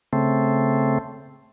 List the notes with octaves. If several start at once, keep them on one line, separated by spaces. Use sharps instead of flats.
C#3 A3 C4